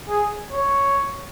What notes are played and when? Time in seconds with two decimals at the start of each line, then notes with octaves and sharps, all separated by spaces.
0.09 G#4
0.52 C#5